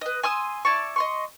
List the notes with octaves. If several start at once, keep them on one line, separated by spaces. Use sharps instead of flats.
B4 D#5
G#5 C6 D#6 E6
E4 D5 A5 C#6
D#5 C6 C#6